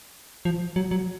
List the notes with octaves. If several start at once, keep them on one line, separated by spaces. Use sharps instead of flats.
F3
F#3
F#3